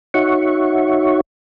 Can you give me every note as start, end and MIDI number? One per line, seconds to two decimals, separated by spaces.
0.14 1.21 63
0.14 1.21 66
0.14 1.21 73
0.14 1.21 76
0.14 1.21 78
0.14 1.21 85